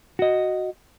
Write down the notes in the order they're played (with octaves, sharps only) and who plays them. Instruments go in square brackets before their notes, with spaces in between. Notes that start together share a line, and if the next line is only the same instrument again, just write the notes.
[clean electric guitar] F#4 D#5